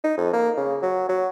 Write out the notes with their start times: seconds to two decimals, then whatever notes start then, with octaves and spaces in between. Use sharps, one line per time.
0.04 D#4
0.18 F2
0.33 A#3
0.57 C#3
0.82 F#3
1.09 F#3